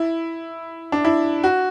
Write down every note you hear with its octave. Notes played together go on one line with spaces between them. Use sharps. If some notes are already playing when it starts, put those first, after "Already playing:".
Already playing: E4
D4
E4
F#4